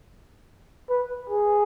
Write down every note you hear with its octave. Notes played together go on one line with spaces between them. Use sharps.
B4
G#4